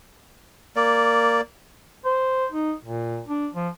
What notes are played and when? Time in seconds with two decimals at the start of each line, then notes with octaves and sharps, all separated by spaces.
0.76 A#3 D5
2.05 C5
2.52 D#4
2.85 A#2
3.27 D4
3.55 F3